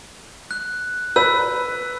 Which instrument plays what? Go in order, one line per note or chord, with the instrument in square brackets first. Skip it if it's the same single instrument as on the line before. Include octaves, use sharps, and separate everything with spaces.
[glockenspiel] F#6
[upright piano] B4 [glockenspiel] E6